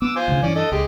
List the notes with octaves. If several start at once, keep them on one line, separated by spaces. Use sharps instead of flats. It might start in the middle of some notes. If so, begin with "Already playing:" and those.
B3 D6 E6
F4 C5 G#5
D2 C#3
G2 E3 C#4 D5
A4 D#5
C#2 G#3 G4